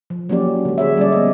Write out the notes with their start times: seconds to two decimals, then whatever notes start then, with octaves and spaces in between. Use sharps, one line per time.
0.10 F3
0.29 F#3 A#3 C#4 F#4 G4 D5
0.65 D3 G#3
0.78 G#4 C#5 E5
0.97 G3 C#4 D5
1.13 B3 D#5